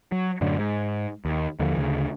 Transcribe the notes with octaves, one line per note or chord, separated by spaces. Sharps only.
F#3
F#2 A2 D3
G#2
D#2
D#2 D3 E3 F3
D2 C#3